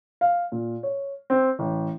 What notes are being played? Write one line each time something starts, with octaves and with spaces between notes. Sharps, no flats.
F5
A#2
C#5
C4
A1